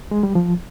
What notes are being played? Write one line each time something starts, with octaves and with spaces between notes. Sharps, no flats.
G#3
G3
F3